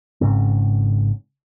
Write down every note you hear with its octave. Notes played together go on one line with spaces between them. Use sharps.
G#1 G#2 C#3 C4